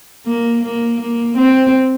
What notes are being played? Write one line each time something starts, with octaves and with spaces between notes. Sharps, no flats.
A#3
A#3
A#3
C4